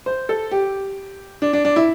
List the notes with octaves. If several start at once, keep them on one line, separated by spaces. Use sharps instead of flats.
C5
A4
G4
D4
D4
D4
E4